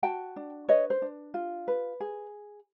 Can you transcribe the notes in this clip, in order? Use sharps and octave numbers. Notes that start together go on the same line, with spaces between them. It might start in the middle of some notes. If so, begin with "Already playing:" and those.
F#4 G5 A5
D4
B4 C#5 D#5
C5
D4
F4
B4
G#4